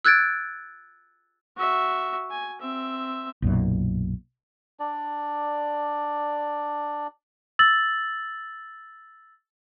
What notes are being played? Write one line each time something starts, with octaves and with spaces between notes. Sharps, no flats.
E6 F#6 G#6 A6 D7
F#4 E5
G#5
C4 E5
B1 F#2 A#2
D4 D5
E6 A6 F#7